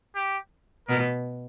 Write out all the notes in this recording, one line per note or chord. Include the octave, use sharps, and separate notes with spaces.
G4
B2 A#4